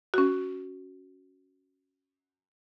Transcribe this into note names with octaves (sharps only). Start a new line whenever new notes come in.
C#4 F#4